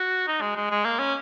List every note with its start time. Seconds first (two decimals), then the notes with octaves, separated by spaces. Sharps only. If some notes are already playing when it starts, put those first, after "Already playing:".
Already playing: F#4
0.27 D#4
0.41 G#3
0.56 G#3
0.70 G#3
0.85 A#3
0.99 C#4